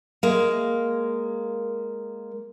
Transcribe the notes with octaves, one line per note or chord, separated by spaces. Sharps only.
G#3 A#3